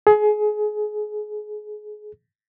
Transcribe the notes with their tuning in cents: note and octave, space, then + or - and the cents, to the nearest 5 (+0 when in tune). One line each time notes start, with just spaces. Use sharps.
G#4 +25